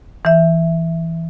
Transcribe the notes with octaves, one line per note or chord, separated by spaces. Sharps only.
E3 E5